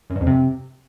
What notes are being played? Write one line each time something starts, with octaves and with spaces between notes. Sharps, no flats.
F#2
G2
F2
C3